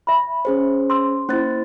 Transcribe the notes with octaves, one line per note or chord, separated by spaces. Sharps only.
E5 B5
C#4 G#4 C5
C6 E6
A#3 C#4 E4 C5 A6